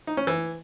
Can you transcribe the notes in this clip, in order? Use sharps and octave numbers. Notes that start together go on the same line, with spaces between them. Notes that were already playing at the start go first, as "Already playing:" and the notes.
D#4
C#4
E3